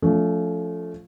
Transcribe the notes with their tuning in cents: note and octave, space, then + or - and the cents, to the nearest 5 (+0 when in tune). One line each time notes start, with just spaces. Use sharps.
F3 +0 A3 -5 C#4 +40